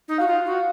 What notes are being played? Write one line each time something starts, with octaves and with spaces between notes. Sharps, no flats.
D#4
F#4 F5
F4
F#4